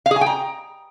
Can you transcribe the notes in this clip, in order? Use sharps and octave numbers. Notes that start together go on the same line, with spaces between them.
F5
G#4
G#5
G5
A#5